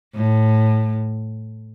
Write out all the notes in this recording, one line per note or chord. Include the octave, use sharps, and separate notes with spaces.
A2